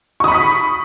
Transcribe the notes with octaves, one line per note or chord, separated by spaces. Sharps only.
B5 C#6 D#6 B6